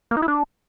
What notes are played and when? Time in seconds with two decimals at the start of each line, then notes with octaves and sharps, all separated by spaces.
0.11 A#3
0.17 D#4
0.22 E4
0.28 D4